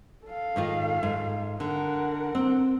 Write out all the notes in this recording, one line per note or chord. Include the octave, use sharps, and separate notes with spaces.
A4 F5
G#2 D#3 F4
G#2
D3 A#4 F#5
C4